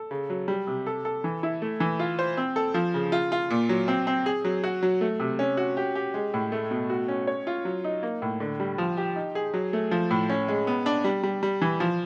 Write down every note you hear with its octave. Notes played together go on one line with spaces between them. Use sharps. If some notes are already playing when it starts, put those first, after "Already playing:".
Already playing: A4
C#3
F#3
G3
C3
A4
A4
E3
E4
A3
E3
F4
C5
C4
A4
F3
C#3
F4
F4
A#2
F#3
C4
C4
G#4
F#3
F#4
F#3
A3
C3
C#4
F#4
G4
G4
G#3
A2
A3
B2
F#4
C#4
C#5
F4
F#3
D#4
A#3
A2
D3
G3
F3
G4
D#4
G#4
F#3
A3
F3
A2
C#4
G#3
B3
D4
G3
G3
G3
E3
F3